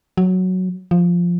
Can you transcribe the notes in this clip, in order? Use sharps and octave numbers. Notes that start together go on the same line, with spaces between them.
F#3
F3